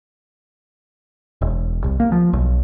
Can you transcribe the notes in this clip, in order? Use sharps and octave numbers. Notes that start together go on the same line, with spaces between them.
E1
C2
A#3
F3
B1